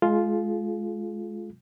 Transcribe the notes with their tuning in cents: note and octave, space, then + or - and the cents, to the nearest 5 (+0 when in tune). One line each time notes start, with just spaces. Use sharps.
G#3 +25 F4 +0 G#4 +45